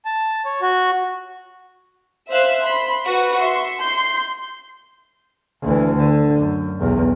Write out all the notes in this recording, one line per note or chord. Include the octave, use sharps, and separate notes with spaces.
A5
C#5
F#4
C5 E5 F5 E6 F#6
B5 C6
F#4 B4
E5 C6 C#6
C6 G6
D2 E3
D3
F#2
B1 E2